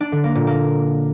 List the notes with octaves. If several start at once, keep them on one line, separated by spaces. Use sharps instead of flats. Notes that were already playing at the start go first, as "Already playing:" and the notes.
D4
D3
A#3
A#2
A#3